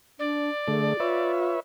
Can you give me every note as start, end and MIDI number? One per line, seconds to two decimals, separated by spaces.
0.19 0.50 62
0.19 1.32 74
0.68 0.93 50
0.68 0.93 57
0.68 0.98 68
1.00 1.56 65
1.00 1.60 71
1.00 1.60 73
1.00 1.60 76